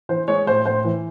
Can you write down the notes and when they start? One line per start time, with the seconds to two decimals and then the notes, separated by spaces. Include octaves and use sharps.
0.09 E3 C5
0.28 G#3 C#5
0.47 A2 C5
0.66 A2 C5
0.84 E3